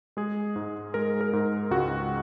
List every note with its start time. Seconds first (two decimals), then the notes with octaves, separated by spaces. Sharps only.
0.17 G#3 G#4
0.56 G#2
0.94 G#3 A#4
1.21 A#4
1.33 G#2
1.71 C#2 F#4